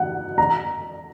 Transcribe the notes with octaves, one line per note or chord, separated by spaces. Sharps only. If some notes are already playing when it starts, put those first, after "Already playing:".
Already playing: F#5
A#5